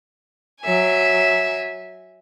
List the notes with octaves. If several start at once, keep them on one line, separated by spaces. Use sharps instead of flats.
F#3 E5 G#5